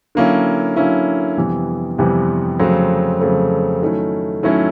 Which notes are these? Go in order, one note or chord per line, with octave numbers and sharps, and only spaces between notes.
D3 F#3 A#3 C#4 E4
D3 F#3 A#3 C#4 E4
F2 C3 E3 G3 B3
F2 C3 E3 G3 B3
F2 C#3 F#3 A3 C4
F2 C#3 F#3 A3 C4
D#3 F#3 A3 C#4 E4
D#3 F#3 A3 C#4 E4